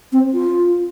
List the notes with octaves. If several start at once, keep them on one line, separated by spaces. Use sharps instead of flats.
C4
F4